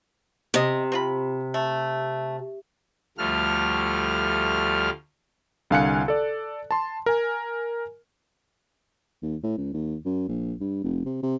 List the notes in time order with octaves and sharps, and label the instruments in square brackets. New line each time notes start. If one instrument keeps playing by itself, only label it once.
[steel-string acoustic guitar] C3 [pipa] C5 D#5
[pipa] C4 F4 B5
A3
[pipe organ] D2 F3 G3 A3 F6
[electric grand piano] C2 D3 F5 G#5 F#6 C#7
A4 D5
A5 C6
A#4 G#5
[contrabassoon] D#2
A2
C#2
D#2
F#2
A#1
G2
F1
C3
C3